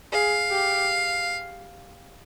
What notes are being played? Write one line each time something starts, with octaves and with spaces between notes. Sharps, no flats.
G#4 F5
G4